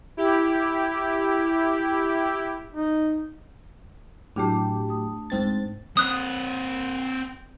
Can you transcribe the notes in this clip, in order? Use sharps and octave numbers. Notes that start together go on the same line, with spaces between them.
E4 G4
D#4
A2 F#3 A3 D4 G4
A3 D#6
G#2 C4 A6
C4 B4 D#6 F#6